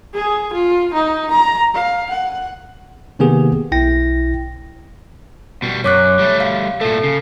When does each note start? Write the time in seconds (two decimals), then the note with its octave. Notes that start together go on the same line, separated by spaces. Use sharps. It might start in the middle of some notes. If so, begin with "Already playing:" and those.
0.14 G#4
0.53 F4
0.93 D#4
1.31 A#5
1.74 F5
2.10 F#5
3.19 C3 D#3 A#3 B3 G4 G#4
3.72 B1 E4 G5 A#6
5.62 B2 G3
5.84 F#2 C#5 D6 F#6
6.19 G3 A3
6.40 F5
6.81 A#2 A3 A4
7.04 C#3